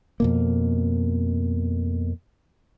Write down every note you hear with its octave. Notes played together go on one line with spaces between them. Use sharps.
F2 B2 A#3